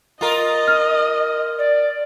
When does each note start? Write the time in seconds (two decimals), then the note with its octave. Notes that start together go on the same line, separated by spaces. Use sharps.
0.21 F4 A#4 D#5
0.68 F6
1.58 D5